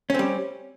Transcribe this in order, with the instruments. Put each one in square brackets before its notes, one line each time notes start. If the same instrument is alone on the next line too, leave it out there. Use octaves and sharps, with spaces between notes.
[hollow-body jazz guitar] C#4
C4
G3